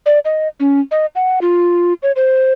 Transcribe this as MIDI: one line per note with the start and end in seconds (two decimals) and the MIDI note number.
0.06 0.19 74
0.25 0.48 75
0.60 0.80 61
0.91 1.06 75
1.15 1.39 78
1.41 1.93 65
2.03 2.12 73
2.16 2.53 72